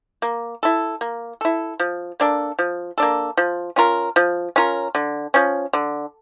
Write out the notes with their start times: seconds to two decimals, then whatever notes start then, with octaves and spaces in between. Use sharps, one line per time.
0.22 A#3
0.63 E4 A4
1.01 A#3
1.41 E4 A4
1.80 F3
2.20 A#3 D4 A4
2.59 F3
2.98 A#3 D4 A4
3.37 F3
3.76 C#4 F4 A#4
4.16 F3
4.56 C#4 F4 A#4
4.95 D3
5.34 F3 C#4
5.73 D3